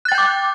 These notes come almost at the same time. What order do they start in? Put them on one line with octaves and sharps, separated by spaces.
F#6 A6 G5 G6 D6